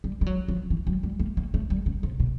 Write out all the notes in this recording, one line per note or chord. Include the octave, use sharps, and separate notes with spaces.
G3
G3
F#3
F3
E3
F#3
G3
A#3
A#3
A3
G3
C#3
C3
B2